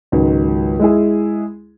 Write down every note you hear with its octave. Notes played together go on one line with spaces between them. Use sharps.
C#2 G#2 D#3 F#3
G#3 E4 G#4